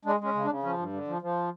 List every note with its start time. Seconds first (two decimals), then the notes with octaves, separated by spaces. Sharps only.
0.05 G#3 D4
0.20 G#3 C#4
0.35 C#3
0.44 D4
0.48 C#3
0.63 F3 C#4
0.78 G2
0.93 D3
1.08 F3
1.22 F3